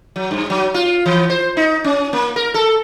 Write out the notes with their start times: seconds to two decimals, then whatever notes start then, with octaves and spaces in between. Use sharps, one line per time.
0.16 F#3
0.31 G2
0.50 F#3
0.74 F4
1.06 E3
1.30 C5
1.57 D#4
1.84 C#4
2.13 A#3
2.36 A#4
2.54 A4